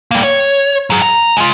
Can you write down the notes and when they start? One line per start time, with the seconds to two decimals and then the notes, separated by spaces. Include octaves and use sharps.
0.11 G3 A#3
0.23 C#5
0.90 F#3 G#4
1.02 A#5
1.37 G#3 F4